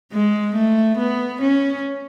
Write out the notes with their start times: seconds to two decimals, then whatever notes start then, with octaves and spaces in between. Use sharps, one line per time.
0.13 G#3
0.55 A3
0.98 B3
1.41 C#4